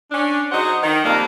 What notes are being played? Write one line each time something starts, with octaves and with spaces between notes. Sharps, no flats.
C#4 D4
F#3 D#4 G#4 C5 F#5
D#3
F2 G3 A#3